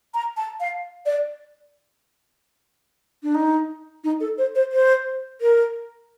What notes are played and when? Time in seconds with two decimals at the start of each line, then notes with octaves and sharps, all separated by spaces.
0.14 A#5
0.37 A5
0.60 F5
1.06 D5
3.23 D4
3.35 D#4
4.04 D#4
4.20 A4
4.38 C5
4.55 C5
4.72 C5
5.41 A#4